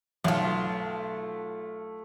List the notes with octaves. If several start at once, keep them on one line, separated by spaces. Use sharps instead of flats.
B1 A3 F4